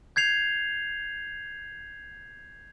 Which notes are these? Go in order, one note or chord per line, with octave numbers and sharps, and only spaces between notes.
G6 G#6 C7 F7